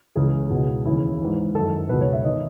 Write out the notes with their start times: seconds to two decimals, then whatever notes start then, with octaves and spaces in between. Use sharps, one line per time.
0.15 C#2 C#3 E3 G#4
0.50 C#2 B2
0.85 D#2 C#3 E3 E4
1.20 G#2 E3
1.55 F#2 D#3 A4
1.89 C#2 B2 B4
2.01 C#5
2.13 E5
2.24 D#3 D#5